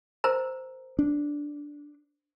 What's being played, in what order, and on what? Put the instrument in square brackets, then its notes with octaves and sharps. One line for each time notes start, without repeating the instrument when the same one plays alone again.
[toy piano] A#4 C5 A#5
[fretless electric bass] D4